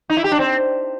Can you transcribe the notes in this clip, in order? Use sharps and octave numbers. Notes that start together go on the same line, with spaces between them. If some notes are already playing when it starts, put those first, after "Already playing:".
D#4
E4
G4
D4
C4